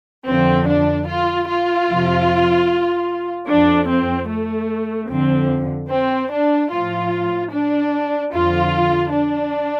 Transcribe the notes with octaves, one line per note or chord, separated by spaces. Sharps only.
F2 D3 F3 C4
D4
F4
F4
F2 C3 F3
F2 F3 D4
C4
A3
F2 D3 F3 C4
C4
D4
A2 F3 F4
D4
F2 D3 F3 F4
D4